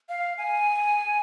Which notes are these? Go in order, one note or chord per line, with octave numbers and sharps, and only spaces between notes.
F5
G#5